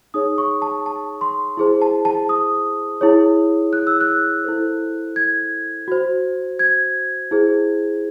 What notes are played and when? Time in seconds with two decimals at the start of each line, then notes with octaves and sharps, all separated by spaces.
0.14 D#4 G#4 C#5 D#6
0.38 C#6
0.62 A5
0.86 A5
1.21 C6
1.57 E4 G#4 C5
1.82 A5
2.05 A5
2.29 D#6
3.01 E4 G#4 C#5
3.73 F#6
3.87 E6
4.01 F#6
4.44 E4 A4 C5
5.16 G#6
5.88 F#4 C5
6.59 G#6
7.31 E4 G#4 C5